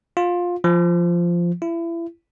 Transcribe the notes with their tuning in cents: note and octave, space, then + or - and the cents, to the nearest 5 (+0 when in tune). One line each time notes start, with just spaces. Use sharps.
F4 +15
F3 -10
E4 +30